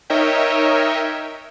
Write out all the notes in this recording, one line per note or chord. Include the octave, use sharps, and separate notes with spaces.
D#4 A#4 C#5 D#5 E5 G5